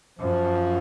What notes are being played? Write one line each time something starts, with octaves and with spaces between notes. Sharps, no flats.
F#2 F3